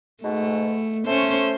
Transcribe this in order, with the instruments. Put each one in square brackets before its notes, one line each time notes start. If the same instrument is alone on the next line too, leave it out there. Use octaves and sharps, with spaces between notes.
[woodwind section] G#2 B2 [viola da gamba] A3
[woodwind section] A3 [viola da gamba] C#4 C5